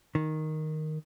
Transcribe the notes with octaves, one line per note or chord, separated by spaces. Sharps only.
D#3